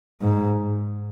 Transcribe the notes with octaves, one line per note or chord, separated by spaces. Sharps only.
G#2